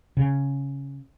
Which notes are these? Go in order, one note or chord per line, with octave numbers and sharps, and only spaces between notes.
C#3